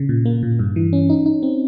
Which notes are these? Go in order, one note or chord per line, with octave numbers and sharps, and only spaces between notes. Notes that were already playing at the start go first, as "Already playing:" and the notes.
Already playing: C#3
A#2
A#3
A#2
G2
E3
C#4
D#4
D#4
C4